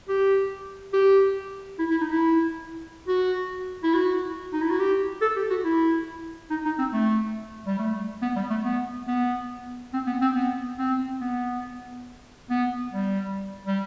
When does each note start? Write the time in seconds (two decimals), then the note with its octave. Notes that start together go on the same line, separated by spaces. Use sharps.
0.08 G4
0.93 G4
1.79 E4
1.91 E4
2.01 D#4
2.11 E4
3.08 F#4
3.83 E4
3.94 F#4
4.53 D#4
4.62 E4
4.70 F#4
4.79 G4
5.21 A4
5.36 G4
5.50 F#4
5.64 E4
6.50 D#4
6.65 D#4
6.78 C4
6.93 A3
7.66 G3
7.79 A3
8.22 B3
8.36 G3
8.50 A3
8.65 B3
9.08 B3
9.93 C4
10.07 B3
10.21 C4
10.35 B3
10.79 C4
11.21 B3
12.50 B3
12.93 G3
13.66 G3